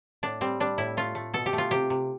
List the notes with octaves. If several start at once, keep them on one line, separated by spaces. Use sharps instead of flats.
A2 D4
G3 C4
G3 D4
A2 E4
A3 F4
A3
B2 A4
G4
A3
F4
C3 G4
C3